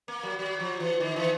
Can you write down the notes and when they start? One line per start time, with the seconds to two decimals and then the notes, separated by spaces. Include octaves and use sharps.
0.08 A#3
0.23 F#3
0.39 F#3
0.60 F3
0.80 E3
1.00 D#3
1.16 E3